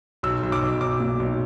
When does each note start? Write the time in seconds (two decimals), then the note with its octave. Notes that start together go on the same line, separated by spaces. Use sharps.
0.23 B1 E6
0.43 B1
0.52 D6
0.62 B1
0.81 B1 D6
1.00 A#2
1.20 B1